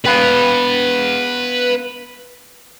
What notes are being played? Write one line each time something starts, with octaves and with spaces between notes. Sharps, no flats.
B3 B4 F5